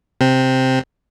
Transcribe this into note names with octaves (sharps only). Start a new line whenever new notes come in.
C3 C4